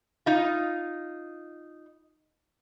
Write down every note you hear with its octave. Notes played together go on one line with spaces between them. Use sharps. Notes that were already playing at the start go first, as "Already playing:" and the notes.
D#4 F4